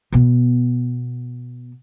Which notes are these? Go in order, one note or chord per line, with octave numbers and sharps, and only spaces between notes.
B2 B3